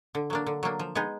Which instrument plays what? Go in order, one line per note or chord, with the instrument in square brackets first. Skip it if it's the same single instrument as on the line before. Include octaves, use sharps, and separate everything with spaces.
[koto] D3
F#3 A#3 D4
D3
F#3 A#3 D4
F3
G#3 B3 D#4 G#4